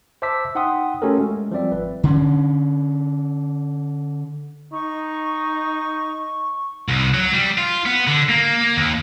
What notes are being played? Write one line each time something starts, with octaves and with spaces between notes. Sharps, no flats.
C5 E5 A5 D6 E6 B6
D#4 F#5 G5 C6 D#6
A3 C#4 F#4 G4 A4 A#4
G#3
F3 G3 C4 D5 E5
G#1 B4
D3 C#4
D#4 C#6
C2
F#3
G3
F4
B3
D3
A#3
D#2